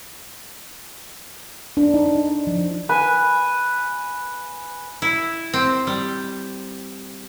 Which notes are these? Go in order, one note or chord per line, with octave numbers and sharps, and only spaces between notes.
D4
D#4
D#4
F3
B4 G#5
E4
C4
G3